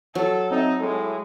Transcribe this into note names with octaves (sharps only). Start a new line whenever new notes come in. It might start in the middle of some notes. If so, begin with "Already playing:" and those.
F#3 A4
C4 D#4 D#5 E5
A2 G#3 A4